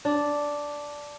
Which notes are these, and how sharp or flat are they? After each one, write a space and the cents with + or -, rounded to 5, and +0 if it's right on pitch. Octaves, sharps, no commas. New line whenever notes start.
D4 -5